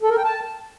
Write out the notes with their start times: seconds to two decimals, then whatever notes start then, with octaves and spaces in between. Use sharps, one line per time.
0.02 A4
0.10 A#4
0.17 G5
0.24 A5